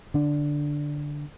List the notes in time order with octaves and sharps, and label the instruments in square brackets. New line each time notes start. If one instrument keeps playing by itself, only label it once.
[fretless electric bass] D3 D4